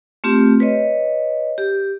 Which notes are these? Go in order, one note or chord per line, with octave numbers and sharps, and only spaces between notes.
A3 C4 F4 G4
B4 C#5 D#5
G4